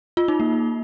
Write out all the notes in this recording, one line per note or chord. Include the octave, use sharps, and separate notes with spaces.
F4
D#4
A#3